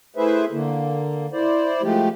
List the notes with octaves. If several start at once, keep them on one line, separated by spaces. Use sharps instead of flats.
A3 E4 G#4 B4 C5 E5
D3 A#3
E4 C5 D5
F3 G#3 A3 G4